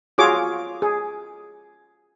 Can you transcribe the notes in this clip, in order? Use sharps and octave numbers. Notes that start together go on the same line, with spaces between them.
F4 F#4 G#4 C#5 D6
G#4